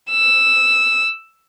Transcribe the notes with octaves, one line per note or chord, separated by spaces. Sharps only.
E6